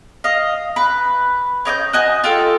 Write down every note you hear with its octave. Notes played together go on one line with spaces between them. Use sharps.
D#5 F5
B4
C#4 D#5 D6 G6
F#4 D#5 G#5
F4 G4 A4